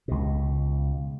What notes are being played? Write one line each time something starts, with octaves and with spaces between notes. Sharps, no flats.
C#2 B2